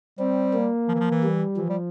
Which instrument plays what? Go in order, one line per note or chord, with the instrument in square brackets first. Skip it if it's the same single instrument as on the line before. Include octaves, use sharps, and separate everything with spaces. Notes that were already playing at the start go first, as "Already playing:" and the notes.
[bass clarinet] G3 [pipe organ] C4
[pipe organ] A#3
[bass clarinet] F3
E3
F3
E3
[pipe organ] G3
[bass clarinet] E3 [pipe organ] F3
[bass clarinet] G3